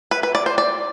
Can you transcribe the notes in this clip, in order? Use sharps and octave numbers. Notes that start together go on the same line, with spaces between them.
B4
B4
D5
C5
D5